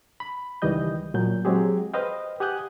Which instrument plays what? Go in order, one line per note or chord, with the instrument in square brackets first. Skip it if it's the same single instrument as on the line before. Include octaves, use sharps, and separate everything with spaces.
[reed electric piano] B5
C#2 D#3 E3 G3 D#5 G6
A#2 F#3 G6
F#3 G#3 C4 G4 G#4
B4 C5 D#5 F5 G5
G4 F#5 G#5 D#6 F#6 G6